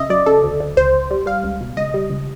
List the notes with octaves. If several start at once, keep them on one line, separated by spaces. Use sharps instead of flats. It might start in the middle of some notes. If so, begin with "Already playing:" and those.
Already playing: C#3 D#5 E5
F#3 D5
C#3 A4
D2
D2
C#2 C5
C#2
G3
G3 F5
C#2
B2
C#2 D#5
G3
C#2